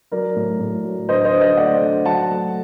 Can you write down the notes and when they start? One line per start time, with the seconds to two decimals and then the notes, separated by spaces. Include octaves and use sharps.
0.12 F#3 A#4 D5
0.36 A2
0.60 A2
0.84 F#3
1.09 D3 C5 D#5
1.25 C5 D#5
1.33 D3
1.41 C5 D#5
1.57 A3 D5 F#5
1.81 D3
2.05 F#3 F#5 A5
2.30 A3